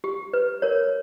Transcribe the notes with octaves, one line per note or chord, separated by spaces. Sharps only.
G4
B4
A#4 C#5